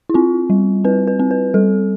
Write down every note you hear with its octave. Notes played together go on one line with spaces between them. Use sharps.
E4
C4 F4
G3
C4 B4
B4
C4
B4
G3 A4